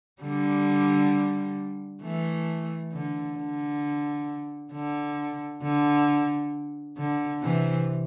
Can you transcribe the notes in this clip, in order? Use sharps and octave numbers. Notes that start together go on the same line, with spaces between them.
D3 G3
E3 A3
D3
D3
D3
D3
D3
C3 E3